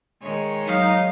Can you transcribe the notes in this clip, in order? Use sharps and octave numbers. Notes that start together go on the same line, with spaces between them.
D#3 G#3 C#5
F#3 D#4 F5